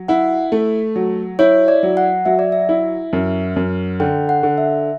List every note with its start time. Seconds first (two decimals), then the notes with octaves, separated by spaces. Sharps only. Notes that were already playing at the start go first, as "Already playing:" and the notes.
Already playing: F#3
0.08 E4 F#5
0.52 A3
0.96 F#3
1.39 E4 C#5
1.68 D5
1.83 F#3
1.97 F#5
2.25 F#3 E5
2.39 D5
2.52 E5
2.69 E4
3.13 F#2
3.56 F#2
4.00 D3 G5
4.29 F#5
4.43 D3
4.58 E5